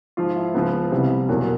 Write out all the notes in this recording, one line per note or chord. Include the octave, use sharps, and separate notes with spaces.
G#2 F3 F4
E4
C#2 C#3 F3 B3
C2 C3 E3 G3
E2 B2 F#3 A#3